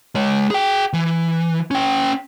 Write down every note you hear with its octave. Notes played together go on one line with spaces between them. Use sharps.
G#3 C#5
G#4 G5
E3
C#4 G5